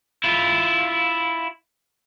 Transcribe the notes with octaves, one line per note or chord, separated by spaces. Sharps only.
E4 F4